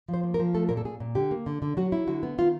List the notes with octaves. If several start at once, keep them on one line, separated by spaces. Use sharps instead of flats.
F3
C5
A#3
A#4
F3
A3 A4
A#2 A#4
A4
A#2 G#4
A#2
D3 G4
A#3
D3
D3
F#3 F#4
E4
D3 F#4
B3
D#3 F4